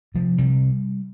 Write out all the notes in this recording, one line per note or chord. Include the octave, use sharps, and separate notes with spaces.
C3 F3
C3 G3